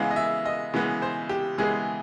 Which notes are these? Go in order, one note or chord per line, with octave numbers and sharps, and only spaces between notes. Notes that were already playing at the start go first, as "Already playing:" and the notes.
Already playing: C#3 E3 G#3 B3 F5
D#5
E5
D#5
C#3 E3 G#3 B3
C5
G4
C#3 E3 G#3 B3 G#4